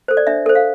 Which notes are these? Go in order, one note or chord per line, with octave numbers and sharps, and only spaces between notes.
A4 C5
D5
D4 E5
A4 C5
F5